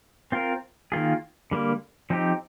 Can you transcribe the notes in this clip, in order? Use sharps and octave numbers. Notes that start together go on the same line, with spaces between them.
C4 F4 A#4
D#3 A#3 F4 G#4
D3 G3 A#3
F3 C4 D#4 G4